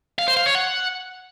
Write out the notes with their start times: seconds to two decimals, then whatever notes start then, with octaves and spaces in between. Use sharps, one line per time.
0.19 F5
0.28 C5
0.37 F5
0.46 C#5
0.55 F#5